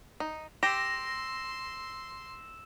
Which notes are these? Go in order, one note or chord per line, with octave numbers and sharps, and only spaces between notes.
D#4
G4 C6 E6 A#6 E7